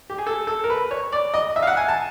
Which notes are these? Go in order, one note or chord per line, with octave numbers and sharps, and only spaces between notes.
G4
G#4
A4
A4
A#4
B4
C#5
D5
D#5
E5
F5
F#5
G#5
A5